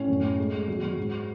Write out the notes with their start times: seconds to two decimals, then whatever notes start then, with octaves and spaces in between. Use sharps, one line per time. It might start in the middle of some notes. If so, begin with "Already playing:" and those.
Already playing: A2 C#4 C#5
0.09 F#2
0.23 A3
0.38 G#3
0.54 G#3
0.68 F#3
0.83 F#3
0.98 G#2